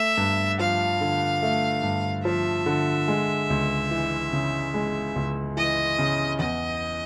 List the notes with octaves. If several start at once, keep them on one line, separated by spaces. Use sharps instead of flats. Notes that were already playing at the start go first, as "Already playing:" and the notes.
Already playing: A3 E5
G2
F3 F5
D3
A3
G2
F3 E5
D3
G#3
C#2
E3
C#3
G#3
C#2
E3 D#5
C#3
E2 D#5